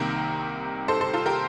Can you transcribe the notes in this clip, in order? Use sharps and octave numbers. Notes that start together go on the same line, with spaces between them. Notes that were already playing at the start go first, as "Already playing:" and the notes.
Already playing: C2 C3 D#3 A#3 G4 A#4
A4 C5
A4 C5
F4 A4
G4 A#4